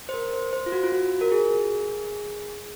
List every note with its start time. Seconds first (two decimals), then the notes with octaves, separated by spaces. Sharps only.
0.09 C5
0.14 A#4
0.33 C5
0.53 C5
0.66 F4
0.72 F#4
0.83 F4
0.92 F#4
1.21 A#4
1.32 G#4